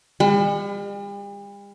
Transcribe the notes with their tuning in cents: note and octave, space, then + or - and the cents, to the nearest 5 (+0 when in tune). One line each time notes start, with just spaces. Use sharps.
G3 +45